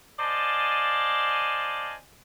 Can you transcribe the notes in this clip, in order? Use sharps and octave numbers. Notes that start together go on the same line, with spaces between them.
C5 D5 D#5 F5 G#5 A5